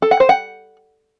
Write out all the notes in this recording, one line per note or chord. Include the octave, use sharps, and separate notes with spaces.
A4
F#5
C5
F#5